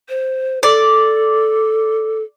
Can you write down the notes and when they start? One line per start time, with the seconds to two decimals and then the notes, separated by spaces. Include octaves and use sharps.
0.09 C5
0.63 A4 D5